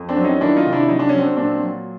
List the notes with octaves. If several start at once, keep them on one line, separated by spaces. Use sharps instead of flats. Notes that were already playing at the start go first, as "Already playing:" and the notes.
Already playing: F2
C4 D4
F#3
C#4 D#4
D#3 D4 E4
D#4 F4
C3
D4 E4
F#3 D#4
D4
F#3 C#4
C4 D4
A#2 C4 D4
F#3